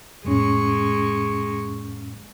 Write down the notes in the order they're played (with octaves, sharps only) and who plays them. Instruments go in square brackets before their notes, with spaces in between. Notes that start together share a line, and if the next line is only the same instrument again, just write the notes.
[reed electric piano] F2 A2 C#4 [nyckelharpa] G#3 C#6